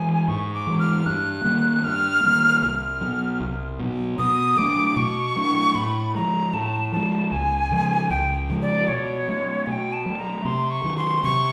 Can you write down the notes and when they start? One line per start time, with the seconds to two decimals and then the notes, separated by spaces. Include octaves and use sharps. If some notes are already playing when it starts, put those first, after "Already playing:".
Already playing: E3 G#3 G#5
0.28 G#2 C#6
0.54 D6
0.67 E3 G#3
0.79 F6
1.06 G2 F#6
1.44 D#3 G3 A#3
1.84 G2 F6
2.24 D#3 G3 A#3
2.62 C2 F6
3.01 B2 F#3
3.40 C2
3.80 B2 F#3
4.19 B2 D#6
4.58 F#3 A3 D4 D6
4.96 B2 C#6
5.36 F#3 A3 D4
5.75 A2 B5
6.15 F3 G#3 A#5
6.53 A2 A5
6.93 F3 G#3 A5
7.32 C#2 G#5
7.71 C#3 F3 G#3
8.10 C#2 G5
8.50 C#3 F3 G#3
8.62 D5
8.88 B2 C#5
9.28 F#3 A3
9.66 B2 G5 G#5
9.93 A5
10.06 F#3 A3
10.19 A#5
10.45 C3 C6
10.70 C#6
10.84 D#3 F#3
10.97 C6
11.23 C3 C#6